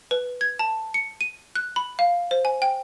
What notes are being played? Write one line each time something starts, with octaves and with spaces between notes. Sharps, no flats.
B4
G#6
A5
C#7
D#7
F#6
B5
F5
C5
G#5
G5